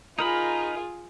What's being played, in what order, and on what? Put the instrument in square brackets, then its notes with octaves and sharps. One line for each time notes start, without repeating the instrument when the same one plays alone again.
[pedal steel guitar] D#4 A#4 B5 [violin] F4 G#4